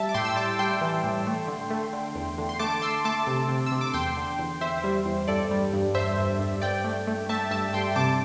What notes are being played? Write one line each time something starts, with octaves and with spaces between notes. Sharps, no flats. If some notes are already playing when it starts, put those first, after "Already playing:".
Already playing: G3 E5 A5
D6
A2 G5 C6
E6
G3 A5 D6
G3 G5 C6
E3
A2
A3
D3
A3
D3
E2
D3
C6
A3 A5 D6
A3 C6 E6
A3 A5 D6
C3
C3
E6
C3
D6
E2 G5 C6
D3
E2
E2 C5 E5
G3
E2
G2 A4 D5
G3
G2
G2 C5 E5
G2
G2
G2 D5 G5
A3
A3
A3 E5 A5
G2 E5 A5
G2 G5 C6
C3 A5 D6